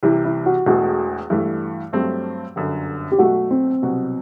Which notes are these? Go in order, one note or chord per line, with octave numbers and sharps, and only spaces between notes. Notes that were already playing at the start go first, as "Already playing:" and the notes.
C2 C3 E3 E4
E4
F#4
E1 E2 B2 A3 F#4
G2 E3 A3
G2 F#3 A3 C4
G1 F#2 D3
G4
B1 B2 F#3 A3 F#4
C4
C2 B2 F#3 B3 F#4